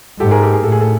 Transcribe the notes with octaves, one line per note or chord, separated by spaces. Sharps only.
G#2 G4 A4
G#4 A#4
G4 A4
G#4
A2 A4
G#4
A4